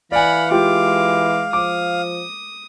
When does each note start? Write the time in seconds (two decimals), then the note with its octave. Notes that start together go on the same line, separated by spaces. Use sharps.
0.12 E3 D5 F5 F#5 G#5 B5
0.51 G#3 F4 G4 G5 D6
1.53 F3 D6 D#6